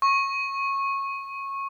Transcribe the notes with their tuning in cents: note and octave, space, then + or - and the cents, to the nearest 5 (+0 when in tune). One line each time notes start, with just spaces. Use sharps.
C#6 -20